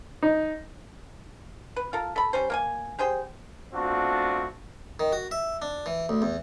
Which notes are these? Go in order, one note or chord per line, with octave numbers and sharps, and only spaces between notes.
D#4
B4
F4 A4 A#4
A4 B5
G3 C#4 C5
A#3 A#4 G#5
G4 G#4 C5 G5
A3 B3 C4 D4 F4 F#4
D#3
F#4
E5
D4
E3
D2
E2